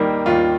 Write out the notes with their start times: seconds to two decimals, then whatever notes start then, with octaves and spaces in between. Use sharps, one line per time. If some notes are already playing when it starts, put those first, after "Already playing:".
Already playing: D#2 D#3 G3 A#3
0.26 D#2 F4